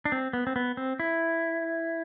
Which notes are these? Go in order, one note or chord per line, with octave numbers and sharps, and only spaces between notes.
D4
C4
B3
C4
B3
C4
E4